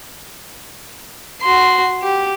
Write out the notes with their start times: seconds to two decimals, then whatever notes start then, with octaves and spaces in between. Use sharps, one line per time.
1.41 F#4 C6
2.02 G4